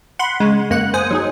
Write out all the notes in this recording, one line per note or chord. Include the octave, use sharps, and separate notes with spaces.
F#5 B5 C6
C#3 G#3
F#2 A#3 F#5 F#6
C5 G#5 D#6
F#3 D#4 G#4